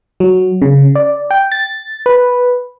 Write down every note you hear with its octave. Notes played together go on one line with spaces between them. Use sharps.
F#3
C#3
D5
G5
A6
B4